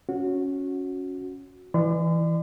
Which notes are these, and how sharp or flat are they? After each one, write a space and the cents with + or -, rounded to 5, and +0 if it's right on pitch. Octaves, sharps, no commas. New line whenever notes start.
C#4 +0 F#4 -15
E3 +0 D5 +30 C6 -45